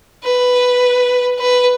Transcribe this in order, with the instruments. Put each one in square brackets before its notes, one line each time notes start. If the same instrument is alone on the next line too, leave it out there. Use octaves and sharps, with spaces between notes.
[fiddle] B4
B4